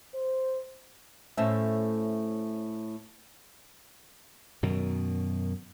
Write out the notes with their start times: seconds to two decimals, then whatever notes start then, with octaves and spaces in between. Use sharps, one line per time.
0.14 C5
1.37 A2 A3 C#4 C5 E5
4.63 F#2 B2 D#3